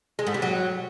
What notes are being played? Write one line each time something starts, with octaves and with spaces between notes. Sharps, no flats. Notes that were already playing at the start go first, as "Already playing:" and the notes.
G#3
G#2
G3
F#3